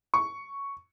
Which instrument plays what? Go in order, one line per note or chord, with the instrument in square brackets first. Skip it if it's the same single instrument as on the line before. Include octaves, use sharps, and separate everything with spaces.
[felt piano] C#6